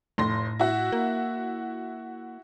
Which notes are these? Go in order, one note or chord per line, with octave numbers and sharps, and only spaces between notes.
F1 A2 C6 A#6
E4 F#4
A#3